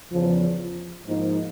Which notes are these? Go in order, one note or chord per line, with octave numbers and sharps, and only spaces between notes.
E2 C#3 F3
G#2 F3 A#3 D#4